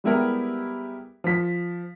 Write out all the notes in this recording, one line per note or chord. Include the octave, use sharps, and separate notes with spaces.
G3 G#3 B3 E4 G4 A#4
F3 B6